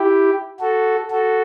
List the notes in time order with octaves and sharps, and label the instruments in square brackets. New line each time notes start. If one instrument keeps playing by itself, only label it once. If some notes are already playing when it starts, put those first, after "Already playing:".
Already playing: [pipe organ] E4 G4
F#4 A4
F#4 A4